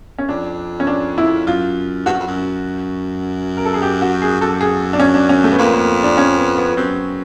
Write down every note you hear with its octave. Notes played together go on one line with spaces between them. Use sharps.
C#4
F2 D4
C#4
D4
E4
F#2 F4
G2 F#4
F#2
F2
F#2
A#4
A4
G#4
G4
F#4
G#4
F#2 A4
G#4
D4
C#4
D4
C#4
A3
B3
F2 A#3
A#3
D4
C#4
B3
B3
F#2 C4